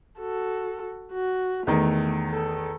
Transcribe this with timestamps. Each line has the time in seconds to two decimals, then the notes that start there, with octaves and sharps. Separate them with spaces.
0.20 F#4 A4
1.12 F#4
1.67 E2 D#3 A3
2.32 A4